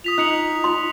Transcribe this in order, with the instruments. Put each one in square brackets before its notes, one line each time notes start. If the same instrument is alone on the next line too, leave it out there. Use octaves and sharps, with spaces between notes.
[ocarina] F4 [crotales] D#6 B6 F7
[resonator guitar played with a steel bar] D#4 [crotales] F#6 C#7 F#7
[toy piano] C6